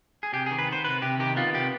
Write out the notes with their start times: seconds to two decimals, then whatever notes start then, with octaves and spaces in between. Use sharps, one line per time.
0.23 G#4
0.33 C3 G4
0.46 G#4
0.51 D#3
0.58 B4
0.67 B3
0.72 C5
0.84 C3 B4
1.02 C3 G4
1.19 D#3 G4
1.37 B3 F4
1.55 C3 G4